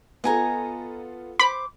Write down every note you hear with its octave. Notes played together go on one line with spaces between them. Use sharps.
B3 F4 A4 D#5 G#5 A#5
C5 B5 D6